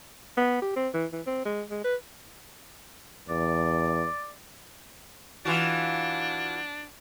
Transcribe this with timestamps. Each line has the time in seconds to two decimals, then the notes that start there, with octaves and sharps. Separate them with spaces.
0.37 B3
0.62 G4
0.76 C4
0.94 E3
1.13 E3
1.26 C4
1.45 G#3
1.70 G#3
1.84 B4
3.29 E2 D5
5.45 E3 D4 F4 F#4